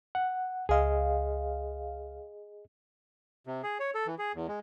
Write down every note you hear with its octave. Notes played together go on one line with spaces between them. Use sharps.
F#5
C#2 G#4 D#5 F5
C3
G#4
C#5
A4
E3
G#4
E2
G#3